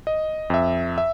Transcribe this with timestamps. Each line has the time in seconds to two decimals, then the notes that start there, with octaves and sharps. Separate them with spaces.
0.07 D#5
0.50 F2 E5
0.98 E5